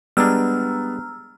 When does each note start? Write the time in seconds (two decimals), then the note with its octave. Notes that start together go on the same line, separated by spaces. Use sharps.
0.17 G3 G#3 B3 D4 A#5 E6 F6